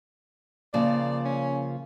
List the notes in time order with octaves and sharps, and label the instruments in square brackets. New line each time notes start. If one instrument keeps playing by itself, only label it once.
[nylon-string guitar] C#3 F3 A#3 [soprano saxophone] D5
[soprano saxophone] C#4